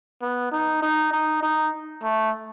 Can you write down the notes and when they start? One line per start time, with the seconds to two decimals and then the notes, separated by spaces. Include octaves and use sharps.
0.22 B3
0.52 D#4
0.82 D#4
1.12 D#4
1.43 D#4
2.03 A3